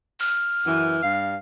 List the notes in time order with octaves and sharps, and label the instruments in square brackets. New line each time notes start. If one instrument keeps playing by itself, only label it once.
[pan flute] F6
[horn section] F#2 E3
G2 F5